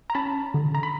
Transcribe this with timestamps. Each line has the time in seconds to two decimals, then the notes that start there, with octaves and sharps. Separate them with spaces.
0.10 A#5
0.15 C#4 A5 B5
0.54 D3
0.75 A#5
0.83 B5